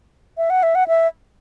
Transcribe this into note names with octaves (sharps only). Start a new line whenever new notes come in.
E5
F#5
E5
F#5
E5